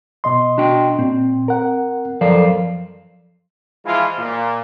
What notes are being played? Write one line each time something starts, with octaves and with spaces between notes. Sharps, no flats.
B2 D#5 C6
D4 F#4 G5
A#2 C4
A#4 F#5
F#2 F3 A4 A#4 D5 F5
E3 F3 G#3 E4 F4
A#2